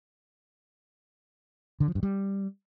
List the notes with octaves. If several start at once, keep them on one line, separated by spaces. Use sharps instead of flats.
D3
F3
G2
G3